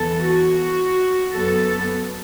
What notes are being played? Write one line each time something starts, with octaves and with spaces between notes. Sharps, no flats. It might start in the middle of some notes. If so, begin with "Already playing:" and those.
Already playing: E2 E3 B3 A4
F#4
F#2 F#3 B3 A4